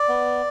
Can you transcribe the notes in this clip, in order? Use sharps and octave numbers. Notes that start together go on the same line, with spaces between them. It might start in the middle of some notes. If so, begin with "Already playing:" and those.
Already playing: D5
B3